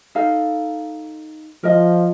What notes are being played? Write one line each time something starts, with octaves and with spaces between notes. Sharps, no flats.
D#4 A4 F5
F3 A#4 D#5